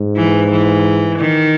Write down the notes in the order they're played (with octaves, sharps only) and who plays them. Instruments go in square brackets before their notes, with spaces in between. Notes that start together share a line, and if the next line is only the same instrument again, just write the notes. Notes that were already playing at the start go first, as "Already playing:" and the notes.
Already playing: [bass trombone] G#2
[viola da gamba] E3
E3
D#3